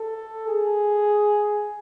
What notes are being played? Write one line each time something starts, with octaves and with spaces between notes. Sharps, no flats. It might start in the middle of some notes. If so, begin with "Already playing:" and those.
Already playing: A4
G#4